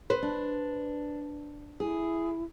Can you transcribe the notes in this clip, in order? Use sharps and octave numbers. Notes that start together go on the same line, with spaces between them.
B4 C5
D4
E4 G#4